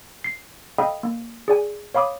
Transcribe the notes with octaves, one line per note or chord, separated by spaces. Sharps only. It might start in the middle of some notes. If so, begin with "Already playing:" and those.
C7
A4 D#5 F5 G5 B5 D#6
A#3
G#4 D5 G#5
C#5 F5 B5 D6 D#6